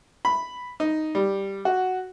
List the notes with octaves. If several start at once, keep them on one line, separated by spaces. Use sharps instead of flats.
B5
D#4
G3
F#4